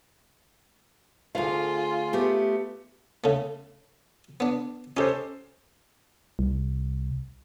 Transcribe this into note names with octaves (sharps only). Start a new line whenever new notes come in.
D2 F4 G#4 F5
A3 B3 G4
C#3 A3
B3 D4
C#4 D#4 G4 A4 C5
C2